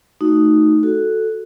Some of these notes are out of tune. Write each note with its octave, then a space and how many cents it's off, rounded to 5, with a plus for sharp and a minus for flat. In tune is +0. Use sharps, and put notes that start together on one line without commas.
A3 +0 D#4 +0 F#4 +0
F#4 +0 A4 +0